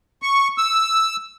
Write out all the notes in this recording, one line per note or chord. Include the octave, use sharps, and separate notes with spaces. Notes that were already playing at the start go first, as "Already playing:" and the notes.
C#6
E6